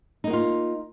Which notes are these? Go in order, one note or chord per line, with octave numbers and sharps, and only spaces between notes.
A#3 D#4 F4 F#4